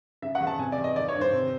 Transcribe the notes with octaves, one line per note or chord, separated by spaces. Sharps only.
C#3 E5
F#5
E2
A5
C3 G#5
D5
E2
D#5
D#3 D5
C#5
G2
C5
C3